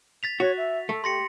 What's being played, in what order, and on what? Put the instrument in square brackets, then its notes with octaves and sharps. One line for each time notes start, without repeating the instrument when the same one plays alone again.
[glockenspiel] A6 B6 F7
[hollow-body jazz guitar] F#4 [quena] C#5
[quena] E5
[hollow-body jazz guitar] A3 [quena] A4
[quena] G4 [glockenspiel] C6 A#6 C#7